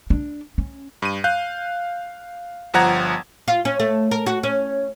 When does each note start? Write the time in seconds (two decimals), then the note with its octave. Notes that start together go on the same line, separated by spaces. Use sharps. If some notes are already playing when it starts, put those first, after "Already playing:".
0.10 D4
0.58 C#4
1.02 G2 D#7
1.24 F5 F#6 G6
2.74 G1 F3 F#5 A#5 G#6
3.48 F4
3.65 C#4
3.80 A3
4.11 A#4
4.26 F#4
4.43 C#4